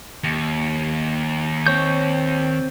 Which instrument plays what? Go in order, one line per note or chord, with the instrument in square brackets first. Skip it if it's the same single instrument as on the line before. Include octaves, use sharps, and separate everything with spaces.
[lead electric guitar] D#2
[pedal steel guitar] C4 C#5 G6